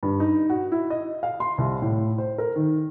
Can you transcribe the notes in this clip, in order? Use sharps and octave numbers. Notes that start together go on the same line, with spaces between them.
G2
D#4
F#4
E4
D#5
F5
C6
C2
A2
C5
A#4
D#3